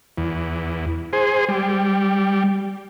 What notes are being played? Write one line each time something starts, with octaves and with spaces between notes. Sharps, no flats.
E2
G#4 C5
G3